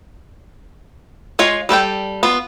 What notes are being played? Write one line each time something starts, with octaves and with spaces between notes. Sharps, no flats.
G#3 F4 C#5 G#5
G3 A4 B4 G5
B3 F4